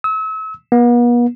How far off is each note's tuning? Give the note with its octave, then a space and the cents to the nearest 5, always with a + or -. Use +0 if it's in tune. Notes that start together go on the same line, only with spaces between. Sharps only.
E6 -35
B3 -45